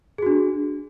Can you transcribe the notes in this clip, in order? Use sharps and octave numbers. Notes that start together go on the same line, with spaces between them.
D4 F#4 G#4